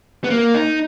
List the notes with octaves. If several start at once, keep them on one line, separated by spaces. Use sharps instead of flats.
B3
A#3
D#4